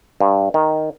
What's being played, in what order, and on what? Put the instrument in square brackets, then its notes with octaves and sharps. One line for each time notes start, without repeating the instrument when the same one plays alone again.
[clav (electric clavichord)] G2
D#3